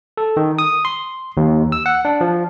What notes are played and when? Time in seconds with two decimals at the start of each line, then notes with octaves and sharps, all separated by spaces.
0.17 A4
0.37 D#3
0.59 D#6
0.85 C6
1.37 D#2
1.72 E6
1.86 F#5
2.05 D4
2.21 F3